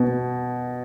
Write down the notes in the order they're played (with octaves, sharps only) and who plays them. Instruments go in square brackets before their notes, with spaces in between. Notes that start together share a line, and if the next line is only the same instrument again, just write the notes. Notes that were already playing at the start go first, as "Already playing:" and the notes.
Already playing: [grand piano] B2